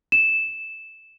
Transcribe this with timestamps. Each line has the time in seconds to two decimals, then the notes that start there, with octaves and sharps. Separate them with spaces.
0.12 E7